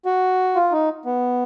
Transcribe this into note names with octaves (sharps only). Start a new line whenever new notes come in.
F#4
F4
D#4
B3